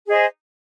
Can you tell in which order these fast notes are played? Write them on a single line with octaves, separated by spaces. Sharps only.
G#4 D#5 C5